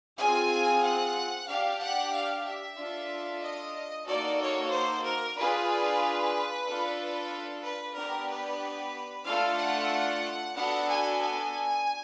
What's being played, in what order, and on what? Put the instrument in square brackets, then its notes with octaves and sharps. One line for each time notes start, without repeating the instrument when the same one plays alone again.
[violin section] C4 F4 G#4 G#5
F#5
D4 G4 F5
F#5
F5
E5
D4 F4 A4
D#5
A#3 D#4 F#4 A4 D5
C#5
C5
A#4
D4 F4 G#4 B4
D4 F4 A4
B4
B3 D4 G4 A#4
B4
A3 D4 F4 A4 F5
F#5
B3 D4 F#4 A4 F#5
G#5
G#5